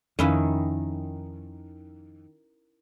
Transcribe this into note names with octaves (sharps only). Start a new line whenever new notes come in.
F2 D#3 C#4 E4 B4